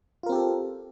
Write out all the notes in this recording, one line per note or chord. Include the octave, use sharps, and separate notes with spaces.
C4 F4 G4 A4 A#4